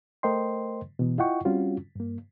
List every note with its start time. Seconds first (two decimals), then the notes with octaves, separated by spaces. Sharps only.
0.23 A3 A#4 C5 D#5 G5 C6
0.99 B2 E3 B3
1.18 E4 F4 D#5 F#5 G5 C#6
1.45 G3 C4 C#4 F4 F#4
1.96 G2 A#3